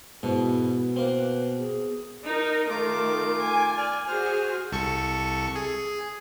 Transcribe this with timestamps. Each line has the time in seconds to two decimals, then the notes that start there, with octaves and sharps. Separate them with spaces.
0.23 G#2 B2 E4
0.96 A#3 C4 B4
1.58 G#4
2.25 D#4 A#4
2.69 D#3 A3 F4 A#4 D6
3.40 G#5
3.77 D5 F6
4.08 F#4 G#4 C5 F6
4.72 C2 A4 C#6
5.56 G#4